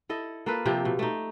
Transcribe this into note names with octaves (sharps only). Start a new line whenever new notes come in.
E4 A4 D#5
A#3 F4 A4 B4
C3 F3 C4 G4
B2
A3 D#4